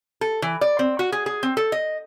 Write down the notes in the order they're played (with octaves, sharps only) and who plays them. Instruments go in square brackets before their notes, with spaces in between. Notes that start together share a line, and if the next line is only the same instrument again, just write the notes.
[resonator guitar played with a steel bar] A4
E3
D5
C4
F#4
G#4
G#4
C4
A4
D#5